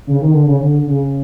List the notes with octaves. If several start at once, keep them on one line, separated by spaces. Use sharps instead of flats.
C#3
D#3
D3
C#3
D3
C#3